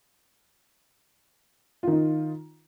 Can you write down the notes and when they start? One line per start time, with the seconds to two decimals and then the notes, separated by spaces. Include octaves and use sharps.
1.83 F4
1.87 D#3
1.92 D#4